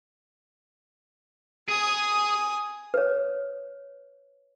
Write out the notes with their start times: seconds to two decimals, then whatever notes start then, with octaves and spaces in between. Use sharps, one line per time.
1.69 G#4 G#5 D#6
2.94 B4 C#5